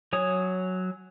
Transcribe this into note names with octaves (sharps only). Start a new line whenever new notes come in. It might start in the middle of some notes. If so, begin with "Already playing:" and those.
F#3 C#5 G#5 D#6